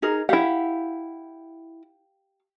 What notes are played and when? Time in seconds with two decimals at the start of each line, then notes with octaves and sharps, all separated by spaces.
0.02 D#4 G#4 A#4
0.29 E4 G4 F5 F#5